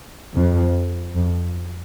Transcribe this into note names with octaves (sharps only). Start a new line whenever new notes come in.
F2
F2